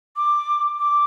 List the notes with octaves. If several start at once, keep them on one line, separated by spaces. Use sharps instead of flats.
D6
D6